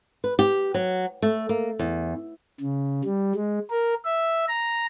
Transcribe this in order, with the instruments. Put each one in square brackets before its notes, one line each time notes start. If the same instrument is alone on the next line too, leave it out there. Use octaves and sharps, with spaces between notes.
[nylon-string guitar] B4
G4
F#3
A3
A#3
E2
[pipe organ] C#3
G3
G#3
A#4
E5
A#5